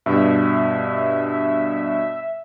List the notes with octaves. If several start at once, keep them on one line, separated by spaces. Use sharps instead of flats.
G2 B2 E5